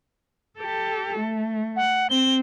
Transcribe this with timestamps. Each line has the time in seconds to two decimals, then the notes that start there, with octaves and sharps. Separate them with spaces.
0.59 G4 A4
1.19 A3
1.76 F#5
2.10 C4 G7